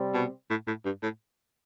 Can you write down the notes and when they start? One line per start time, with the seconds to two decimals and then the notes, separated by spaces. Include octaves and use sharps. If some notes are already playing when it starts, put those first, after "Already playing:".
Already playing: C3 G3 C4
0.14 B2
0.50 A2
0.67 A2
0.85 G2
1.03 A2